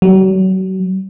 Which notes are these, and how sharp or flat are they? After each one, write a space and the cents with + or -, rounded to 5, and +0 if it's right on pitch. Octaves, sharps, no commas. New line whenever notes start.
F#3 +35